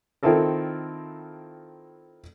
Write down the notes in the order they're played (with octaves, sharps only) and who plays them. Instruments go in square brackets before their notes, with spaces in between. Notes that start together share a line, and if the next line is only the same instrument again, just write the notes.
[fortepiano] D#3 C4 E4 F4 A4 A#4